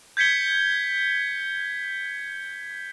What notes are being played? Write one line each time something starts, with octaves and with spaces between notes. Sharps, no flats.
G6 G#6 B6 C#7 G7